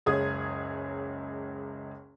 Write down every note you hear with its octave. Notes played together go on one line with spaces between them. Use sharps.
F#1 C#2 G#4 C#5 D#6 G#6